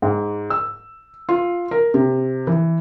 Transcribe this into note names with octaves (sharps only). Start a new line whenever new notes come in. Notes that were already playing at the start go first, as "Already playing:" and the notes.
G#2
E6
F4
A#4
C3
E3